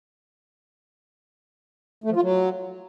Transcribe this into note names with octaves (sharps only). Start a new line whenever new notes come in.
A3
F3
F4
F#3